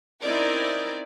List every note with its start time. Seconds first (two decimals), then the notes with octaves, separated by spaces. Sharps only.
0.22 C4 C#4 D#4 E4 A#4 D5